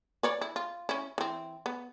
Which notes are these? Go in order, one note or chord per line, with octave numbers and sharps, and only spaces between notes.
B4 C#5 D5
E4
F4
C#4 E4
E3 C4
B3